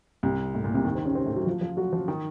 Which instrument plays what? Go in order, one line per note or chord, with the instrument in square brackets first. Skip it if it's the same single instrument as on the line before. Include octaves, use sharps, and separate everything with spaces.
[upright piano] C2 C3
A2
A#2
C2 C3
D#2 D#3
C3 C4
C#3 C#4
C3 C4
A2 A3
F#3 F#4
F3 F4
F3 F4
F#3 F#4
F3 F4
D#3 D#4